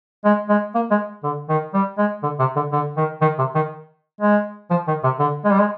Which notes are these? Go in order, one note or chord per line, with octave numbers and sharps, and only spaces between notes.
G#3
G#3
A#3
G#3
D3
D#3
G3
G#3
D3
C3
D3
D3
D#3
D#3
C3
D#3
G#3
F3
D#3
C3
D3
G#3
G3
G#3